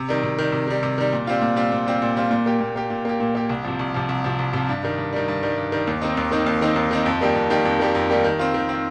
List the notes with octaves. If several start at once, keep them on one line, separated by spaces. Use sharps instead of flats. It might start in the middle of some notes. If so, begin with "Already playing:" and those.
Already playing: C3
D#3 G3
C3
D#3 G3
C3
D#3 G3
C3
D#3 G3
A#2
G3 C4 F4
A#2
G3 C4 F4
A#2
G3 C4 F4
A#2
G3 C4 F4
A#2
A#3 G4
A#2
A#3 G4
A#2
A#3 G4
A#2
A#3 G4
C2
C3 F3
C2
C3 F3
C2
C3 F3
C2
C3 F3
G2
D#3 G3
G2
D#3 G3
G2
D#3 G3
G2
D#3 G3
D#2
D#3 C4 D#4
D#2
D#3 C4 D#4
D#2
D#3 C4 D#4
D#2
D#3 C4 D#4
F2
D#3 G3 A#3 G4
F2
D#3 G3 A#3 G4
F2
D#3 G3 A#3 G4
F2
D#3 G3 A#3 G4
D#3
C4 F4
D#3
C4 F4